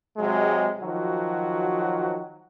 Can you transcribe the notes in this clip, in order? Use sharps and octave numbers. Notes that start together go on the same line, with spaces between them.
C3 F#3 G#3
D#3 F3 F#3 F#4